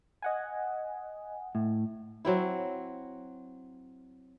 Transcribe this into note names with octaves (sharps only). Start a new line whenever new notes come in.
D#5 F#5 G#5
A2
F#3 C4 E4